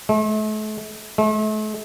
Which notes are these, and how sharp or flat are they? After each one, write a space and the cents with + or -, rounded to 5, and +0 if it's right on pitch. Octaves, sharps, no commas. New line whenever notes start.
A3 -40
A3 -40